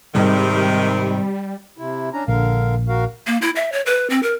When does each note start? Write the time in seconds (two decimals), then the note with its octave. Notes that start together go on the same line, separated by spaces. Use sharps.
0.15 C2 G#2 C3 D#3 G3
1.78 C3 E4
2.13 C#4 D4 A#5
2.28 A#1 D3 A#4 F5
2.88 F#4 A#4 F5
3.27 A#3
3.42 E4
3.56 E5
3.72 C#5
3.86 B4
4.10 C4
4.23 A#4